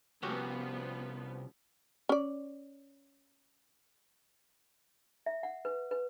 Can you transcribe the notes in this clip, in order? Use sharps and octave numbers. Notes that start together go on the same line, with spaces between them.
C2 F3 B3 C#4 F#4 G4
C#4 D5
E5
F#5
B4
B4